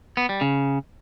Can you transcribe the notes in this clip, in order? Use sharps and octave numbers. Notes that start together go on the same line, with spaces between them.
B3
G3
C#3